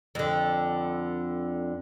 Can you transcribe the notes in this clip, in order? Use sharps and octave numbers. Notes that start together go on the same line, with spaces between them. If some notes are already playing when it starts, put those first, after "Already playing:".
F2 D3